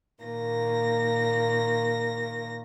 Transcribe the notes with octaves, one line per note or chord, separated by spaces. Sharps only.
A#2 D#3 A#3 A#6